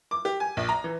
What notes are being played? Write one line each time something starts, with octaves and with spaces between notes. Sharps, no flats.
D6
G4
G#5
A#1
A#5
E3